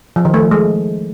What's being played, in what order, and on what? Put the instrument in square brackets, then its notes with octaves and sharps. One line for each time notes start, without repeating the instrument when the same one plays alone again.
[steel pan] F3
D#3
A3
F3
G#3